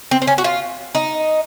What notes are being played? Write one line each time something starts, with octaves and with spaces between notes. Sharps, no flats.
C4
C4
C#4
F#4
F4
D#4